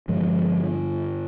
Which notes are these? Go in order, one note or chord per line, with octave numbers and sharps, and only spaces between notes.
G2 D3 F3 G#3